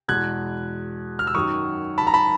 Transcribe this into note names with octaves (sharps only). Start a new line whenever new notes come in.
E2 B2 G#3 F#6 G#6
F6
E6
F#2 D#3 F#3 C#6 D#6
A5 B5
A#5
A5 B5